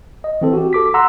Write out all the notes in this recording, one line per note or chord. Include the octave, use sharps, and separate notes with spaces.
D#5
E3 C4 A4
F#4 G4
A4 D6 B6
F#5 A#5 C6 E6